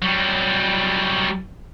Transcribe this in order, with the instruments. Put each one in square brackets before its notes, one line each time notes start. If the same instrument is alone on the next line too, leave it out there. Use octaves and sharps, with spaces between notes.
[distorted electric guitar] F#3 G3